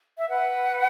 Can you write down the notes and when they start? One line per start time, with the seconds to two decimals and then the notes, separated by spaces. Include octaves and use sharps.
0.18 E5
0.29 B4 F#5